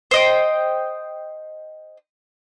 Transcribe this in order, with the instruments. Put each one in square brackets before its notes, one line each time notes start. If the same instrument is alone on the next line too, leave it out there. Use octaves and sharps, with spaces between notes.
[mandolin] C5 D#5 G5